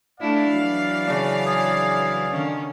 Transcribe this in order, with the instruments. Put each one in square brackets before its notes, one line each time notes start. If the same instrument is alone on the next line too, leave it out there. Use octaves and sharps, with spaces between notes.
[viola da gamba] A3 D4 E4 [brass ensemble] D5 F5
[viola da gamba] E3 F#3
[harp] C#3 D4
[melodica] G#4
[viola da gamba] D3 D#3 C#4